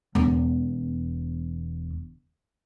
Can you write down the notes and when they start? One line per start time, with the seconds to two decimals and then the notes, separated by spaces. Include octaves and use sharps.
0.15 E1 E2